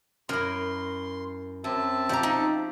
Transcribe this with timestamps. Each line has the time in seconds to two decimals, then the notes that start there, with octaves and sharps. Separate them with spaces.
0.29 F#2 E4 A#4 C6
1.64 F#2 C4 E5 A5
2.09 F3 D4 G4 A#5
2.23 D#4